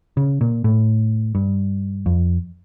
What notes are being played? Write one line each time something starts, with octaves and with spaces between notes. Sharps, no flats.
C#3
A#2
A2
G2
F2